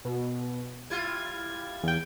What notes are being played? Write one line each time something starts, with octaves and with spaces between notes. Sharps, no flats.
B2
G3 E4 F4 G#6
E2 G5